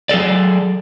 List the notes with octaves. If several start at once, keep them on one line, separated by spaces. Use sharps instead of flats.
F#3 G#4 A4 D5